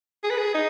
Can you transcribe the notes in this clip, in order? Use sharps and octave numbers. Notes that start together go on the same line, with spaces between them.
G#4
B4
G#4
D#4